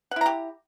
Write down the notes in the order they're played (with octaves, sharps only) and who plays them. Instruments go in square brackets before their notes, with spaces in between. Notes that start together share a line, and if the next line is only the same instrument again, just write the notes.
[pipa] F#5
E4
A#5
G4